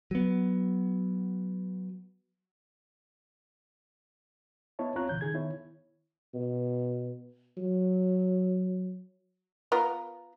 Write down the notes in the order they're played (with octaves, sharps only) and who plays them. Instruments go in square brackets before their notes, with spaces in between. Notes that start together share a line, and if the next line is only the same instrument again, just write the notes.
[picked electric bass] F#3 B3
[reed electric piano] B3 E4 C#5 D#5 A5
D2 C4 F4 C#5 A#5 F#6
C2 A#2 C#3 E3 G6
D#3 G#4 G#6
D#3 B3 E4 C#5
[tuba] B2
F#3
[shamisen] B3 F4 A#4